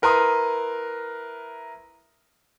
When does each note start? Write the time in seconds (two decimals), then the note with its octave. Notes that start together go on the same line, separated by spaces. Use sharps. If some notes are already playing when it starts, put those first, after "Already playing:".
0.02 E4 A#4 B4 A#5 C6 D#6